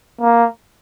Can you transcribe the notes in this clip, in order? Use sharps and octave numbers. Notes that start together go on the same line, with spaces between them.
A#3